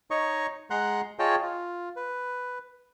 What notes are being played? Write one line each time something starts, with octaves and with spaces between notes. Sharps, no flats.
D#4 C#5 D#5 C#6
G#3 F#5 A#5 C6 F#6
F4 G#4 C#5 D#5 G5 A5
F4
B4